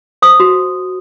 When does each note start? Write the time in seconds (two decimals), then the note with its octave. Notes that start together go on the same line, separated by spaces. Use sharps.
0.22 C5 D#6
0.40 F#4